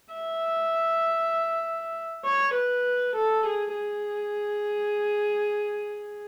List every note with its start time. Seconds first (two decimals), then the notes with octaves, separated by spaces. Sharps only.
0.13 E5
2.25 C#5
2.54 B4
3.15 A4
3.46 G#4
3.75 G#4